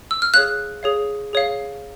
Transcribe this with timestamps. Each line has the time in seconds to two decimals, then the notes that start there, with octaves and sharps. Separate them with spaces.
0.11 E6
0.22 F6
0.34 G#4 C#5 F5 F#6
0.83 G#4 C#5 F5
1.33 G#4 C#5 F5